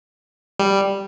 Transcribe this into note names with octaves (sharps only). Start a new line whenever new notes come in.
G3